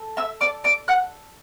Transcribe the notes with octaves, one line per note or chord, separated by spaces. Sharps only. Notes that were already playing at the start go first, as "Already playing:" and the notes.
Already playing: A4
E5 E6
D5 D6
D5 D6
F#5 F#6